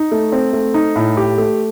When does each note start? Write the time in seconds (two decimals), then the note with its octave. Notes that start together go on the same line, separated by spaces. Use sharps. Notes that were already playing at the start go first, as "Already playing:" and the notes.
Already playing: D#4
0.11 A3
0.32 C4
0.53 A3
0.74 D#4
0.96 A2
1.17 G4
1.38 A3